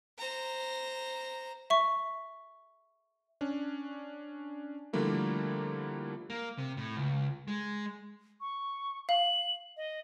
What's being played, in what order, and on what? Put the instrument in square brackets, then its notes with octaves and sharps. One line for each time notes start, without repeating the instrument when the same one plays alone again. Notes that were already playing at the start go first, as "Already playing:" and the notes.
[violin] C5 A#5
[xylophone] E5 C#6
[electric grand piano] C#4 D4
D3 F3 G3 A3 A#3 E4
[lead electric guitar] A#3
C3
A2
C#2
G#3
[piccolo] C#6
[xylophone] F5 [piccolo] F#7
[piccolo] D#5